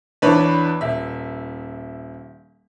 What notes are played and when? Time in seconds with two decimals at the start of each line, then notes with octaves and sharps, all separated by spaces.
0.22 E2 D4 B4 C#5 B5
0.81 D#1 E5